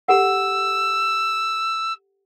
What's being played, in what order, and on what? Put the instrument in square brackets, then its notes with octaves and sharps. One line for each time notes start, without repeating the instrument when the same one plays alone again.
[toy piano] G4 A4 F#5 [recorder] E6